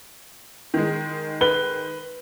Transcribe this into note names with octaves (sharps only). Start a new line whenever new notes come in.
D#3 G#3
B4 G7